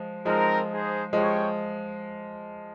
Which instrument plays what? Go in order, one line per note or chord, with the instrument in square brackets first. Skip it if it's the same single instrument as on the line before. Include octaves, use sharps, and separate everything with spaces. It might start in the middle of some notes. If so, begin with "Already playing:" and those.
Already playing: [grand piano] F3 G#3
[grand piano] F3 G#3 [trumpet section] C4 D#4 A#4
[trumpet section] D#4 G#4 C5
[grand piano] F3 G#3 [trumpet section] C#4 G4 C#5 G5